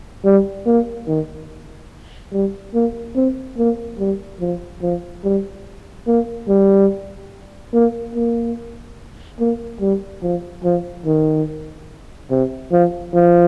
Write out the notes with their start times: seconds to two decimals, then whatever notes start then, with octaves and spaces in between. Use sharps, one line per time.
0.25 G3
0.66 A#3
1.07 D#3
2.32 G3
2.74 A#3
3.16 C4
3.58 A#3
3.99 G3
4.40 F3
4.82 F3
5.24 G3
6.07 A#3
6.48 G3
7.74 A#3
8.15 A#3
9.39 A#3
9.81 G3
10.22 F3
10.64 F3
11.05 D#3
12.30 C3
12.72 F3
13.13 F3